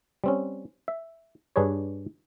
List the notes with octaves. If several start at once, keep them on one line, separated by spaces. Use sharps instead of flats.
G3 C4 C#4
E5
G2 D4 G#4 B4 C#5